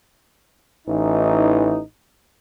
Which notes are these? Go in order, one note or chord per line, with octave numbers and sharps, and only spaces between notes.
A1 E3 D#4